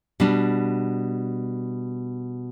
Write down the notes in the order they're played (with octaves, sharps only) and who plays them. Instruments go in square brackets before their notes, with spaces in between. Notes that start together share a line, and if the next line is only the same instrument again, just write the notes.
[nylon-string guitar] B2 G3 D4